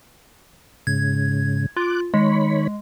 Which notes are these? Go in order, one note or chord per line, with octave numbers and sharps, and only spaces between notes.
G#2 C#3 G#6
F4 D6 F#6
D#3 G#3 C#5 B5